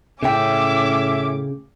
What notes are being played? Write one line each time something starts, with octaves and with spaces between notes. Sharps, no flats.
A2 C#3 C#4 E5 G5 D6